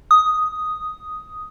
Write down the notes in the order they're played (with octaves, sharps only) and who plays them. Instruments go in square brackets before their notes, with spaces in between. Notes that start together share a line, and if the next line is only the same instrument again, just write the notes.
[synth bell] D#6